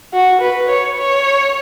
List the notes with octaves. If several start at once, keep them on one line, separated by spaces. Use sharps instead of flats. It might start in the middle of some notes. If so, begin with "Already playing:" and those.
F#4
B4
C#5
C#5